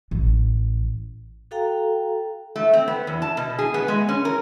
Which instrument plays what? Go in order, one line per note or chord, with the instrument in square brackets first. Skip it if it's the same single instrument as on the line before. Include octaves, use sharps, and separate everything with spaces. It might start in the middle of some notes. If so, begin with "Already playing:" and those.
[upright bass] A1
[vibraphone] F#4 A4 F5 G5 A#5
[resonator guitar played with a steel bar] A3
C4
B3
E2
A5
B2
G#4
B3
G#3
C#4
A#4